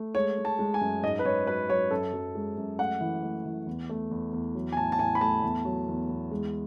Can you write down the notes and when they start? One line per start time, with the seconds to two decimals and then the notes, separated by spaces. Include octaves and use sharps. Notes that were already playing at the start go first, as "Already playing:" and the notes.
Already playing: A3
0.15 G#3 C#5
0.38 G#3
0.45 A5
0.59 G#3
0.74 G#5
0.81 F#2
1.03 G#2 D#5
1.19 B4
1.25 G#2 C#5
1.47 F#3 B4
1.69 F#3 C#5
1.91 F#2 A4
2.13 F#2
2.35 G#3
2.57 F#2
2.79 A3 F#5
3.01 E3
3.23 A3
3.45 E3
3.67 E2
3.90 A3
4.11 E2
4.33 E2
4.55 F#3
4.72 G#5
4.77 A2 A5
4.92 A5
4.99 A2 G#5
5.15 B5
5.21 A3 A5
5.43 E2
5.65 F#3
5.88 E2
6.09 E2
6.31 G#3